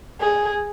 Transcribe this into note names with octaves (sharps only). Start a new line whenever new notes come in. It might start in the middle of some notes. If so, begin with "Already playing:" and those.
G#4